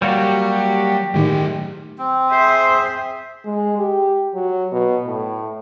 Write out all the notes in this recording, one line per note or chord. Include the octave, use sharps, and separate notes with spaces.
F#3 G3 A#3 F#4 G4 C#5
A2 D#3 F#3 G4 G#4
C4
G#4 C5 E5
G#3
G4
F#3
B2
A2